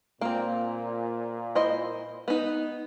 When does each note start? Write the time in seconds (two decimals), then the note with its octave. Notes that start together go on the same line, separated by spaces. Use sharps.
0.21 A#2 A#3 C4
1.55 E4 C5 D#5
2.28 B3 D#4